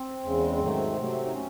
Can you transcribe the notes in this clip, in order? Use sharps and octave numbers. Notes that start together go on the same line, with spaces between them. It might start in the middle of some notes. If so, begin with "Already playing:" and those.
Already playing: C4
E2 C#3 G#3
G#2 D#3 F#3 A3
C3 F#3 A3
D#4
C#4